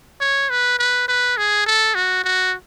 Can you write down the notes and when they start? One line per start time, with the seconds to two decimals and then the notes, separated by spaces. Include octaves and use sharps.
0.21 C#5
0.50 B4
0.79 B4
1.08 B4
1.37 G#4
1.66 A4
1.95 F#4
2.24 F#4